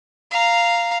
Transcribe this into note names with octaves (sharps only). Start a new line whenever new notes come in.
F5 A#5